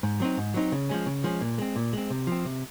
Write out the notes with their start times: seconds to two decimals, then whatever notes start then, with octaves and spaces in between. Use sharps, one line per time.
0.03 G#2
0.20 F#3 C4 D#4
0.37 G#2
0.54 F#3 C4 D#4
0.72 C#3
0.89 F3 G#3 C#4
1.06 C#3
1.24 F3 G#3 C#4
1.41 A#2
1.58 G#3 C4
1.76 A#2
1.93 G#3 C4
2.10 C3
2.27 F3 C4
2.45 C3